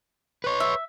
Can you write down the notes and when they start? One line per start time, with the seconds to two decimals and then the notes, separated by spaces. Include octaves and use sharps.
0.44 B4 C#5
0.60 E5